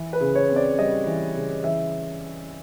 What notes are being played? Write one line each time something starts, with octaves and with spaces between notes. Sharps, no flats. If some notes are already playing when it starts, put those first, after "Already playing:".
Already playing: E3
B4
C#3
C#5
C4
D5
G3 D#5
E3
C#3
E3 E5